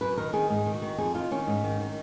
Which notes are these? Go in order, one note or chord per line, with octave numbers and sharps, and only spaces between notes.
F#2 B4
D#3 A#4
D#3 G#4
G#2 G#4
D#3
F#4
D#3
F2 G#4
D#3 F4
D#3 C#4
G#2
D#3
D#3